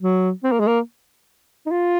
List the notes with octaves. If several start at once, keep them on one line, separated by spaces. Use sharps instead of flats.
F#3
C4
A#3
G#3
A#3
D#4
F4